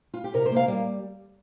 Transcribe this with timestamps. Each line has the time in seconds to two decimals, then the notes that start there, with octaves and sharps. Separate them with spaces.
0.14 F4
0.24 G4
0.34 C3 A#4
0.46 C5
0.52 A#3 F5
0.68 G3